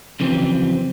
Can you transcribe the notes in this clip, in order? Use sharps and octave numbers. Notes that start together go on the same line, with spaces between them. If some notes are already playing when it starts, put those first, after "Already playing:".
F2 C#3 E3 F#3 C4